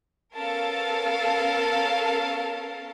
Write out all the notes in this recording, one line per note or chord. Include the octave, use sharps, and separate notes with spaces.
B3 C#4 A4 A#4 F5 A5